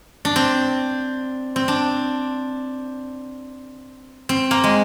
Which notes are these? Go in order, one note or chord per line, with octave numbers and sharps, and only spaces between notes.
D4
C4
C4
D4
C4
A#3
G#3